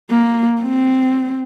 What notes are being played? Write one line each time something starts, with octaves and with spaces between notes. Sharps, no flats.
A#3
C4